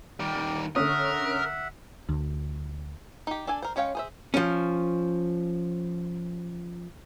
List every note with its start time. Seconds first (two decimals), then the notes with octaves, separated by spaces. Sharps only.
0.20 D#3 G3 D6
0.76 D3 C#4 A#4 E5 F#5 D#6
2.09 D2
3.27 D#4 G4
3.47 D4 A4 D5 G#5
3.62 A#4 C5
3.76 G#3 C#4 C#5 F5 G5
3.95 G#4 C5 E5
4.34 F3 C#4